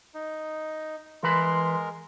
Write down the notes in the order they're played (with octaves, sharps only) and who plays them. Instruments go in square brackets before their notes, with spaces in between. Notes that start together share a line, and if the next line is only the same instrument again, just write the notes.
[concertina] D#4
[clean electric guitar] E3 B4 B5 [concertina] G#3 A#4 [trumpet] C6